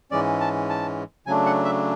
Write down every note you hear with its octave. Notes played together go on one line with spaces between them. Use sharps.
G#2 E3 G#3 C#4 D5
A5
A5
C#3 F#3 A3 D4 G#5
F#5
E5